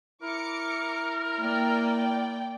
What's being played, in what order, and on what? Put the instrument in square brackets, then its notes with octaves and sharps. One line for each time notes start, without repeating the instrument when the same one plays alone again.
[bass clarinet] E4 [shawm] A#4 [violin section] D6 C#7
[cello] A#3 [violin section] D5 G5